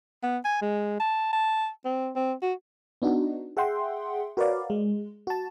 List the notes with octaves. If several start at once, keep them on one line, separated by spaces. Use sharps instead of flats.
B3
G#5
G#3
A5
A5
C4
C4
F#4
B3 D4 D#4 F#4
G#4 E5 F#5 G5 C6
F#4 A#4 B4 C#5 D5 F5
G#3
F#4 A5